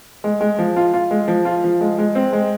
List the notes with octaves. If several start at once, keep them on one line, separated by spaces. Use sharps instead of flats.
G#3
G#3
F3
F4
F4
G#3
F3
F4
F3
G#3
G#3
C4
G#3